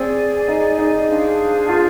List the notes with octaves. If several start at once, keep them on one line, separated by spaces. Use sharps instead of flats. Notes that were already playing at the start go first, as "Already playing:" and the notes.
Already playing: C4 G#4 D5 G#5
D#4
D#4
D4 G#4 C5 F5
F4